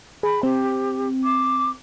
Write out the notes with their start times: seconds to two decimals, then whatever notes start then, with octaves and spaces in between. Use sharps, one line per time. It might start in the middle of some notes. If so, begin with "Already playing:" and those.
0.23 G#4 B5
0.43 C4 G4
1.24 D6